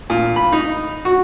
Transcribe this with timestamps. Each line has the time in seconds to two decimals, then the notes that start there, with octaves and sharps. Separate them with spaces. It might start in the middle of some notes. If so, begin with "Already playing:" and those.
0.10 A#2
0.36 B5
0.52 D#4
1.05 F#4